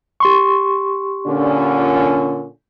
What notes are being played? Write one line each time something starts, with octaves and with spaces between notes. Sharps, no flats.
G4 C6 C#6
A#2 D3 C#4